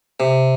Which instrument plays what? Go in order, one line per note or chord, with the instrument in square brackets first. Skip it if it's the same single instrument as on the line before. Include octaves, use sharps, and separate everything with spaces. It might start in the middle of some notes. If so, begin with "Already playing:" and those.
[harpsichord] C3